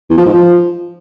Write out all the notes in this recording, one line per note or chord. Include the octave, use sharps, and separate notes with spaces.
E2
F3
G#2
F3